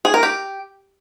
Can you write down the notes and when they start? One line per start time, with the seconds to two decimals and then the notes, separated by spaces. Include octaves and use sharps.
0.05 G#4
0.14 A#4
0.23 G4